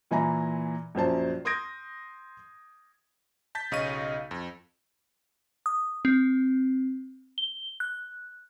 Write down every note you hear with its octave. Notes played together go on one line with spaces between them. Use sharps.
A#2 E3 E4 G#5 A#5
A#1 F#2 C5 A5
C6 D#6 G6 G#6 A#6 D7
A5 G6 A6 B6
B1 C#3 D#5 F5 C#6 D#7
F2
D#6
C4
G7
F#6